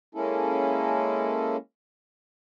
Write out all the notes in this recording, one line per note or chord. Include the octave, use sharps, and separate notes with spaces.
G#3 A#3 C#4 E4 A4